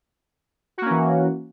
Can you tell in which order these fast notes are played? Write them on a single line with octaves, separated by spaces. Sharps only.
F#4 A#3 C#4 E3